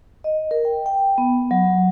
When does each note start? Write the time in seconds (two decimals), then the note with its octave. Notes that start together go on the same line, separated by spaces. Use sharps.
0.24 D#5
0.51 A#4
0.65 G5
0.86 G5
1.18 B3
1.51 F#3